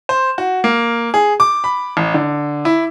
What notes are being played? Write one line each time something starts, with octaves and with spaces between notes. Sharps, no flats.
C5
F#4
A#3
G#4
D6
B5
A1
D3
E4